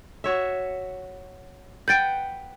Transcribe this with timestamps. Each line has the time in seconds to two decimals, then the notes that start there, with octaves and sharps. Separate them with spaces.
0.24 F#4 C#5 E5
1.88 B4 F#5 G5 G6 A6 D7